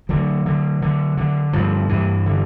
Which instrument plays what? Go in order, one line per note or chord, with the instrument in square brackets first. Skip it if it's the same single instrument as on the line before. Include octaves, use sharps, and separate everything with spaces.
[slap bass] D3 F#3
D3
D3
D3
G2 F3
G2 E3
D3